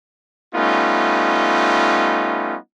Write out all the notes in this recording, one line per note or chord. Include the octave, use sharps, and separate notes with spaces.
G3 A3 B3 C#4 D#4 F4